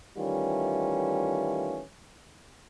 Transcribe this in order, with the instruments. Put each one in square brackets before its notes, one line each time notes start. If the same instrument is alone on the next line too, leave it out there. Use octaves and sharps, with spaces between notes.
[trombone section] D#3 E3 G3 A3 C#4 F4